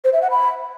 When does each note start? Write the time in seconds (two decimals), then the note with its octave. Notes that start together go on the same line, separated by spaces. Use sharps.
0.04 C5
0.13 E5
0.22 F#5
0.30 B5